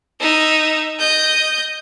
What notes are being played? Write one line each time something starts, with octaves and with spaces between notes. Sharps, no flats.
D#4 E5
D#5 G6